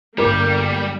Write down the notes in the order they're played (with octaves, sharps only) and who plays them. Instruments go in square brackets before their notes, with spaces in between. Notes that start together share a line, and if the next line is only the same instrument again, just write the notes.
[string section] G1 A#3 [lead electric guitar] G3 G4 [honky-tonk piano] A#4 D6